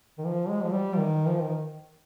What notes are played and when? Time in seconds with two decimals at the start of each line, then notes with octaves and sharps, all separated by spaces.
0.18 D#3
0.25 F3
0.49 G#3
0.63 F3
0.73 G3
0.97 D#3
1.28 F3
1.41 D#3